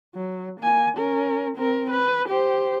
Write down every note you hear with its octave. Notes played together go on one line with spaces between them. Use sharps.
F#3
A#3 G#5
C#4 A#4
C4 A#4
B4
G4 C5